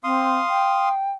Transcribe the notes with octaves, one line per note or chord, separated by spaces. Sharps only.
C4 F5 C6 D#6
G5